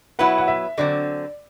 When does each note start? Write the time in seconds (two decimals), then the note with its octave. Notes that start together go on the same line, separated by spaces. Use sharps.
0.19 F#3 B3 E4 B4 F#5
0.38 F#5
0.48 E5
0.78 D3 F#3 C4 D5